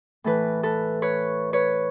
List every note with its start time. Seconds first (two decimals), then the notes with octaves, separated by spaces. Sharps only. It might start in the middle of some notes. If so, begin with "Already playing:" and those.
0.24 A2 E3 A4 B4
0.63 A4 B4
1.02 B4 C#5
1.53 B4 C#5